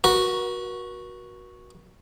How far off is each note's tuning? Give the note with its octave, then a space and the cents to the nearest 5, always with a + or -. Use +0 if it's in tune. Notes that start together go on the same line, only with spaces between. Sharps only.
F#4 -5 A#4 +45